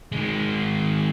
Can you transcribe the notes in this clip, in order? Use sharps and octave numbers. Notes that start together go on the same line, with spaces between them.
D#3 G#3